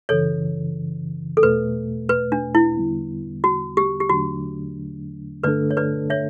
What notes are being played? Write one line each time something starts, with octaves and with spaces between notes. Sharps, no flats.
F#2 C#3 E3 A4 C#5
A4
E2 B2 A3 B4
B4
D4
E4
E2 D3 G3 B3
F#4
G4
G4
E2 D3 F#3 A3 D4 F#4
G2 D3 A3 D4 A4 B4 D5
C#5
B4 D5
C#5 E5